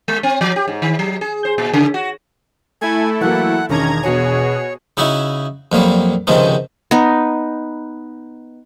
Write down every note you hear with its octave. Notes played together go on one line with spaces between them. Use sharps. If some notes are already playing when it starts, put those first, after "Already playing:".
G#3
C4
F3
G4
G#2
D#3
F#3
G#4
C5
A#2
C#3
F#4
A3 E4 A4 G#5
E3 F#3 A#3 F#5
E1 D#3 C#4 D4 A#5 G#6
B2 F#4 G#4 C#5
C#3 D#4 E4 F#4
F2 A#2 F#3 G3
C#2 G#2 C3 D#3 F3 C#4
B3 D#4